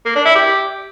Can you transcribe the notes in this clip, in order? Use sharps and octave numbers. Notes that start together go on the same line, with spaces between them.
A#3
D4
E4
G4